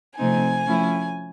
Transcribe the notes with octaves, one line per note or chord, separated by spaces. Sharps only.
C3 F3 A3 C4 D#4 G#5
F3 A3 C#4 E4